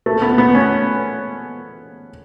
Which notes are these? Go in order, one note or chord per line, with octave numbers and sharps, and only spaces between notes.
A3
B3
B3
C#4